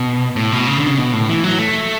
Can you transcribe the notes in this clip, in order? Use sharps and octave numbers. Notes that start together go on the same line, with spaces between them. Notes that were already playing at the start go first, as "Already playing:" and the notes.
Already playing: B2
A2
B2
C#3
D3
C#3
B2
A2
E3
F#3
A3